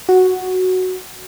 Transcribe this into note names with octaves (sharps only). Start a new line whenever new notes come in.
F#4